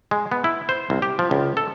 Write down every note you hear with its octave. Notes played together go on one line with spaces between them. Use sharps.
G#3
B3
E4
C5
C2
G4
F3
C#2
A4